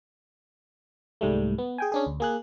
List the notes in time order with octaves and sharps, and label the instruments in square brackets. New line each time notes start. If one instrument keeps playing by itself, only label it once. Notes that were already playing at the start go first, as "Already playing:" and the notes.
[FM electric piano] C2 G#2 G3 A3
B3
G#4 G5 G#5
C#4 D4 G#4
D2
A#3 G#4 F#6